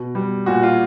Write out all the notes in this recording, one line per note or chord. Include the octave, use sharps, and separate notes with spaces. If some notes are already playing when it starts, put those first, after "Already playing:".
Already playing: B2
G3
A#2 F#4
F4